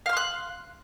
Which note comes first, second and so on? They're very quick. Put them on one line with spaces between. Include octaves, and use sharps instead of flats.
F5 F6 C6 F#6